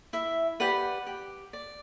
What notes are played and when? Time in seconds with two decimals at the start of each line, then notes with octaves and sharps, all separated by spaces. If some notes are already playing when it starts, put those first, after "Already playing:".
0.13 E4 E5
0.60 G4 B4 D5 F#5
1.07 G4
1.53 D5